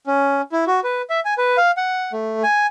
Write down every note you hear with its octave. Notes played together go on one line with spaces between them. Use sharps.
C#4
E4
F#4
B4
E5
G#5
B4
F5
F#5
A3
G#5